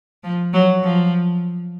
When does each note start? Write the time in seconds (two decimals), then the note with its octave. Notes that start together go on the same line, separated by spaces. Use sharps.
0.24 F3
0.54 F#3
0.83 F3